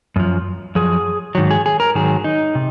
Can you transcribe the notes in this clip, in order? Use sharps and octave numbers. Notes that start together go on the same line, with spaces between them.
F#2 F3
F#2 F3 G#4
G#2 D#3 F#3
G#4
G#4
A#4
G#2 D#3 F#3 G#4
D#4
C3